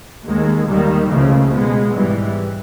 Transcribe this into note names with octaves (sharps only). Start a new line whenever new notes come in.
D#2 D#3 G#3
D#2 D#3 G3 A#3
C#2 C#3 F3 A3
B2 G#3 B3
G#2 E3 G3